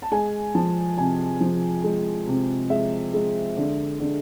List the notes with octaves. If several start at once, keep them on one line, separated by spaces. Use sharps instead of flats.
A5
G#3 G#5
F3 A5
C3 G#5
F3
G#3
C3
G#3 E5
G#3
D3
D3